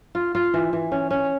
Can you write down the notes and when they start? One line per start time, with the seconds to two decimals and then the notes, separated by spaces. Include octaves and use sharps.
0.15 F4
0.35 F4
0.54 E3
0.73 E3
0.92 C#4
1.11 C#4